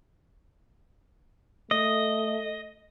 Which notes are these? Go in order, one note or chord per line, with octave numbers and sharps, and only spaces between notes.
A3 D#5